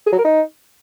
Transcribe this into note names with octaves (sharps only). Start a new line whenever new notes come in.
G#4
F#3
A#4
D#4